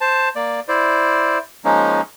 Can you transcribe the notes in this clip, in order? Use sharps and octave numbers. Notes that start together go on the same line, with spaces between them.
C5 A5
A#3 D5
E4 C5 D5
F3 G#3 A#3 C#4 D#4